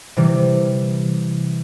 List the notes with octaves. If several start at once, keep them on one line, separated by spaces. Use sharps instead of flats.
C3 E3 G3